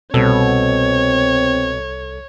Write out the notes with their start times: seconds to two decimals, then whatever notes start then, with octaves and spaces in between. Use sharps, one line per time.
0.14 C2 B2 C4 A4 C#5